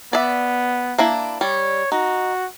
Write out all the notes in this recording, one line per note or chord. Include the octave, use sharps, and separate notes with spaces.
B3 D5 E5
A#3 D4 E4
G3 C#5
D#4 F#4